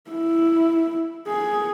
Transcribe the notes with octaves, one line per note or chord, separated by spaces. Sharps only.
E4
G#4